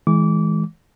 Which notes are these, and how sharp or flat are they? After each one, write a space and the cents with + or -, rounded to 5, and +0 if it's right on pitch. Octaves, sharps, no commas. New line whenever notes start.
E3 -25 G#3 +15 D6 -25